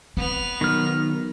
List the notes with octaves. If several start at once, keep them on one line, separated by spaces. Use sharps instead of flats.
B3 C4 F7
B1 D#3 F6